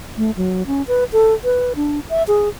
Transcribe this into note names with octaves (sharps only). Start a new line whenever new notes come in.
A3
F#3
C#4
B4
A4
B4
D4
E5
G#4